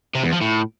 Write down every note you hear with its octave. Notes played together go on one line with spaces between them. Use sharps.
C3
E2
F3
A2